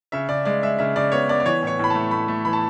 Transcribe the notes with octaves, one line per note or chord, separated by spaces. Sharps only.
C#3 E5
C#3 D5
G#3 D5
G#3 E5
C#3 E5
C#3 D5
B3 C#5
B3 D5
D5
E3 C#5
A2 C#5
A2 B5
A3 A5
A3 B5
A3
E3 B5
A5